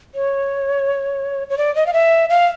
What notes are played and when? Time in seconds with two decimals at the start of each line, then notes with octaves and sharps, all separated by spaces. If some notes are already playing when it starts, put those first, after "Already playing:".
0.15 C#5
1.49 C#5
1.57 D5
1.75 D#5
1.86 F5
1.93 E5
2.29 F5